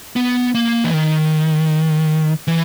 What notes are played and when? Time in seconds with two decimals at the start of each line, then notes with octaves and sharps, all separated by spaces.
0.16 B3
0.55 A#3
0.84 E3
0.94 D#3
2.48 E3